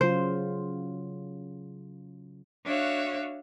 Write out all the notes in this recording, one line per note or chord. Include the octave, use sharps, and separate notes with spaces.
C#3 F#3 F4 C5
D4 F#4 C#5 E5 F5